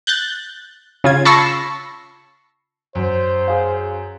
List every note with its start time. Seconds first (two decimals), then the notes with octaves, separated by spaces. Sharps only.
0.07 F#6 G6 A6
1.04 C#3 F4 G#6
1.25 A5 B5 C#6 E6 A#6 C7
2.95 F#2 C5
3.48 G#4 F5